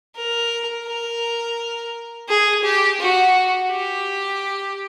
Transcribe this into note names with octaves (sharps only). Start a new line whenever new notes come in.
A#4
A#4
G#4
G4
F#4
G4